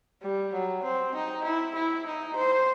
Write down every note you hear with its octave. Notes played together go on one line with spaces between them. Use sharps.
G3
F#3
C4
D#4
E4
E4
D#4
C5